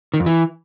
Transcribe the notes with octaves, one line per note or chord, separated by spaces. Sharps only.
D#3
F2
E3